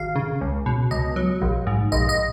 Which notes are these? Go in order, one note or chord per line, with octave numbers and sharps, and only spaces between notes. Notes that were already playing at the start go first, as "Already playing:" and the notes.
Already playing: G#1 F5
C#3
C#2
B2
C#2 D#5
F#3
A#1
G#2
A#1 D#5
D#5